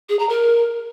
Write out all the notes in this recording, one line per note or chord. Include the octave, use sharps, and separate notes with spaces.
G#4
A#5
A#4